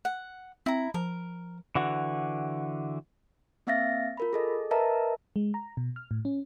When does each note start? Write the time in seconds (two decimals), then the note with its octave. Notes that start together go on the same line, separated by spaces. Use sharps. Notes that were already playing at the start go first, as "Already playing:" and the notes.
0.05 F#5
0.66 C4 E4 A#5
0.94 F3 A#4
1.75 D3 E3 F#4
3.67 A#3 C4 E5 F5 A6 A#6
4.17 F4 A#4 B5
4.33 G#4 A4 D#5
4.71 A#4 B4 D#5 E5 A5 A#5
5.36 G#3
5.54 A#5
5.77 B2
5.96 F6
6.11 A2
6.25 C#4